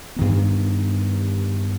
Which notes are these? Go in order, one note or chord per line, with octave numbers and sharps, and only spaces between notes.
G2 D#3 B3